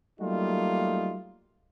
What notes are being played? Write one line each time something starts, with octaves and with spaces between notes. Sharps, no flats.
F#3 G3 A3 A#3 D#4 F4